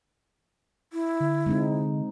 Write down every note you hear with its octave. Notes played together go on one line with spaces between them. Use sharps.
E4
D3
G#3 C4 D#4